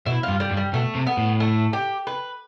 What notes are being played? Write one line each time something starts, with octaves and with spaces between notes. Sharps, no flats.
B2 E4
G2 F4
G3
G2
G3
B2 A3
C3
B3
A2
A3
G4
B4